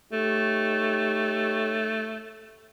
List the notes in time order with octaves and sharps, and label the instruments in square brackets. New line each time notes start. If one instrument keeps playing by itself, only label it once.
[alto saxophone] A3 [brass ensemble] D#4 G4 C#5